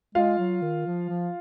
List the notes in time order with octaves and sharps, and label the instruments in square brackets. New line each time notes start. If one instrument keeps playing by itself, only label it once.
[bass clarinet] G#3 [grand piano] F4 F5
[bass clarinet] F#3
D#3
F3
F3